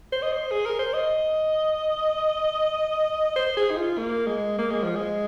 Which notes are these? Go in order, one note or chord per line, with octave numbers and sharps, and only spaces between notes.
C5
D#5
C5
G#4
A#4
C5
D#5
C5
G#4
D#4
F4
A#3
G#3
A#3
G#3
F3
G#3